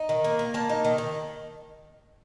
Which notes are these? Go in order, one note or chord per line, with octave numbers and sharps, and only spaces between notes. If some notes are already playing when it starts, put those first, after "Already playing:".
Already playing: D#4
D#3
A#3
A#3
A#3 A5
D#4
D#3
D#3